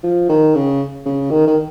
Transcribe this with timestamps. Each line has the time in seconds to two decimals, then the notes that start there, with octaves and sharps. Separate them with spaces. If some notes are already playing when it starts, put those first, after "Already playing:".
0.04 F3
0.29 D#3
0.55 C#3
1.06 C#3
1.31 D#3
1.47 D#3